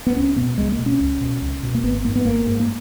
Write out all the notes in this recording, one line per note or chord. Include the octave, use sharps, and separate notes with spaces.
B3
C#2 C#4
B2 B3
C#2 G#3
A#3
B2
C#4
C#2
B2
C#2
B2
A#3
G#1 B3
G#2 A#3
B3
G#1 A#3
G#2
A#3